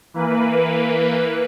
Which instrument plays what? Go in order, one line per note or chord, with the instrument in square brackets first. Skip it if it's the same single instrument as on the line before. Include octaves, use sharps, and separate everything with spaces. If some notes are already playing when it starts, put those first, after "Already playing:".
[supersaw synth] E3 A#3 B4